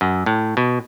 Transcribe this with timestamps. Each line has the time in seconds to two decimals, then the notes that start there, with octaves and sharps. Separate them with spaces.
0.01 F#2
0.26 A2
0.57 B2